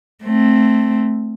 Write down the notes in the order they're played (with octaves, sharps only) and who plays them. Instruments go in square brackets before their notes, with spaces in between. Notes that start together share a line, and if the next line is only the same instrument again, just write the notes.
[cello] A3 C4